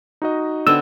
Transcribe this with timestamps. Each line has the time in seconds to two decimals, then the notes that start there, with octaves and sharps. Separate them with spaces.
0.22 D#4 F#4 D#5
0.67 D3 B3 C4 E6